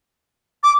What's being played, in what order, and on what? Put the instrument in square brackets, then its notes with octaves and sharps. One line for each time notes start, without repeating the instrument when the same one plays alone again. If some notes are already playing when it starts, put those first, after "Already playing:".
[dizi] D6